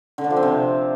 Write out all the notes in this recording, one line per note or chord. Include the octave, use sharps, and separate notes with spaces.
D3
D4
F3
C4
C3